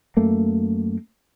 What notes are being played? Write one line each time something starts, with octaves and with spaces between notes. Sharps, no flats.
F#2 A3 A#3